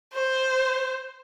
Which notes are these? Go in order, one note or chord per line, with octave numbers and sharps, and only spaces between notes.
C5